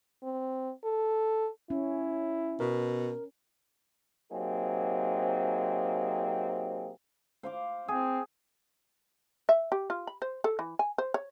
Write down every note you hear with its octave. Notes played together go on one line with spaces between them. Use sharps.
C4
A4
C#4 E4
B2 A#4
C3 F#3 A#3 C4 D#4 G#4
C5 F5 D6
C4 G#4
E5
G4
F4
B5
C5
A4
E3
G#5
C5
C#5